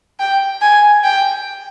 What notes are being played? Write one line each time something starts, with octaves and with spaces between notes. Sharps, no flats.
G5
G#5
G5